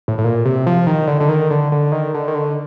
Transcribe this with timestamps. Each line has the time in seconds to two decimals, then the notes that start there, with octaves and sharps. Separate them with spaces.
0.08 A2
0.18 A2
0.24 A#2
0.45 C3
0.67 F3
0.87 D#3
1.08 D3
1.20 D3
1.29 D#3
1.50 D3
1.72 D3
1.92 D#3
2.14 D3
2.28 D#3
2.34 D3